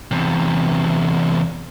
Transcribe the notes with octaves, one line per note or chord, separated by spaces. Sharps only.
E2 C3